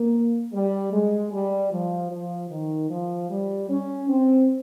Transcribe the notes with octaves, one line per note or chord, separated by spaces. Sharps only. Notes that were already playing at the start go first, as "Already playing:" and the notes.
Already playing: A#3
G3
G#3
G3
F3
F3
D#3
F3
G3
C#4
C4